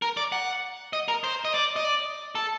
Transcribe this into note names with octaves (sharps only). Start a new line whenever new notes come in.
A#4
D5
F#5
D#5
A#4
C5
D#5
D5
D#5
D5
A4